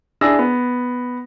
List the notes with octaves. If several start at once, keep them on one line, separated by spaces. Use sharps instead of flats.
D4 E4 G#4 E6 A#6
B3